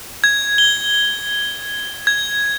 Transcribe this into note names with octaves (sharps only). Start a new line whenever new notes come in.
G#6
G7
G#6